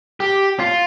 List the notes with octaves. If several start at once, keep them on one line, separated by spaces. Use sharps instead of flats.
G4
F4